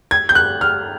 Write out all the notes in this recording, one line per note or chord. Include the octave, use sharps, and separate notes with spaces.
G#6
G6
F#6
F6